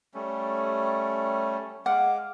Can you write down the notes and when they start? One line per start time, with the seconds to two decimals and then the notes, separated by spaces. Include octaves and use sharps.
0.14 G3 A3 C#4
1.86 G#3 F5 F#5 D6